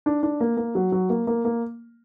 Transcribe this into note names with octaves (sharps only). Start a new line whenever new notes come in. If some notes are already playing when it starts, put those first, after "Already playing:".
D4
D4
A#3
A#3
F#3
F#3
A#3
A#3
A#3